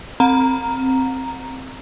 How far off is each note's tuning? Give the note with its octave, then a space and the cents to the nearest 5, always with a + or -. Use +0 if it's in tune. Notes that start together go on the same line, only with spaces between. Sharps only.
C4 +5 A#5 +0